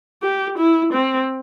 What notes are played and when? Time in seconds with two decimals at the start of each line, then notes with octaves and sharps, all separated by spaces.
0.23 G4
0.57 E4
0.93 C4